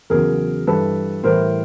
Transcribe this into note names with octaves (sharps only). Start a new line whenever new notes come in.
E2 C#3 F#3 G#4 A#4
G2 E3 G3 A4 B4
A2 E3 G3 A#4 C5